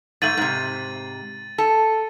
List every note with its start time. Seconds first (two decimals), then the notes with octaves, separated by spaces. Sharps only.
0.22 G#2 A3 A6 D#7 F#7
0.37 G#2 C3
1.58 A4